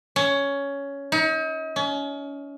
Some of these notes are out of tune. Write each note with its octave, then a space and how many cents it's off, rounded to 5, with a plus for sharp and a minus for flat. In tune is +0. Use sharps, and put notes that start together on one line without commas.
C#4 +10
D#4 +40
C#4 +30